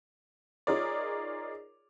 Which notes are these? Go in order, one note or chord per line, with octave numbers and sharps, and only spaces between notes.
D#4 F4 G#4 A#4 C#5 D5